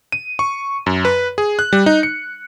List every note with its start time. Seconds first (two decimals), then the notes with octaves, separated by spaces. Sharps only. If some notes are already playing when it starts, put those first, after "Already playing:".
0.12 D#7
0.39 C#6
0.86 F#2
1.05 B4
1.38 G#4
1.59 F#6
1.73 G3
1.86 D#4
2.03 C#7